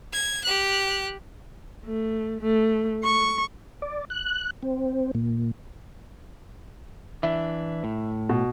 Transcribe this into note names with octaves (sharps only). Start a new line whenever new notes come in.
G#6
G4 F#6
A3
A3
C#6
D5
F#6
C4
A#2
E3 D4 E5
A2
B2